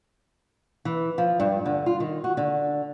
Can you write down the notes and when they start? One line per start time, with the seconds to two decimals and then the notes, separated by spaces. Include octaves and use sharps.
0.85 E3
1.18 F3
1.40 G2
1.66 D3
1.86 F4
2.00 D#3
2.24 F#4
2.37 D3